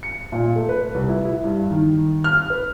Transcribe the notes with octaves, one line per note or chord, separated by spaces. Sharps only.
C#7
A#2
A3
B4
C2
E4
E4
G2
D#3
F6
B4